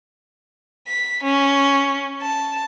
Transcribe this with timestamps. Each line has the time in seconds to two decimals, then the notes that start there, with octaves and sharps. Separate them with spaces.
0.88 B6
1.23 C#4
2.22 A5